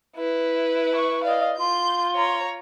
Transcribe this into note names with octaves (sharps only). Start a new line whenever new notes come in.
E4 B4
C#6
D5 D#5 F5
F4 C6 G6
C#5 A#5